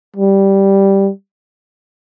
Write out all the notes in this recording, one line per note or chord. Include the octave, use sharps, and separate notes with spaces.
G3